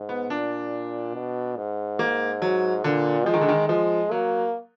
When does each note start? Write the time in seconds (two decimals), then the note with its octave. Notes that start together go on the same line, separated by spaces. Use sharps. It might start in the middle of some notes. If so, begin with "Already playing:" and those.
Already playing: G#2
0.09 B3
0.30 A#2 D4
1.15 B2
1.57 G#2
1.99 A#3
2.42 F#3
2.84 A#2 D3
3.26 F3 G#3
3.34 D#3
3.41 D3
3.48 D#3
3.68 F3 G#3
4.11 F#3 A#3